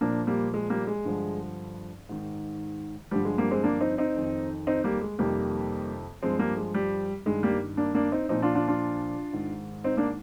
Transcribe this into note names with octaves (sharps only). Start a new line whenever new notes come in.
A#2 F3 A#3 D4
G3 A#3
G#3
G3 A#3
G#3
G2 D3 F3
G#2 D#3
G2 D3 F3 G3
G#3
G3 A#3
G#3 C4
A#3 D4
C4 D#4
C4 D#4
F2 D#3
C4 D#4
G3 A#3
G#3
F2 C3 D#3 G3 A#3
G2 F3 G#3 C4
G3 A#3
G#3
G3
G2 D#3 G#3
G3 A#3
A#3 D4
A#3 D4
C4 D#4
A#2 F3 C4 D#4
D4 F4
D4 F4
D4 F4
G#2 D#3
C4 D#4
A#3 D4